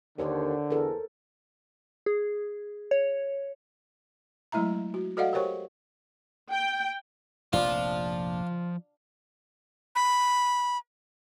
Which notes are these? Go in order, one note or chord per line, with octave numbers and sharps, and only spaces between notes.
D#2 D3 A#4 C5 C#5
E2 A4 A#4
G#4
C#5
F#3 G#3 A3 E4 E5 A#5
F#4
F#4 A4 D5 D#5 F5 F#5
G4 A#4 C5 C#5 G5 C#6
G5
F1 A#1 F3 D4 F4 C5
B5